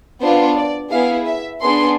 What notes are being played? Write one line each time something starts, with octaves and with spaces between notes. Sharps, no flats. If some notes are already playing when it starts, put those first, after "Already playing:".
B3 D4 F4 C5
D5
B3 E4 G#4 F5
E5
B3 D4 G#4 C6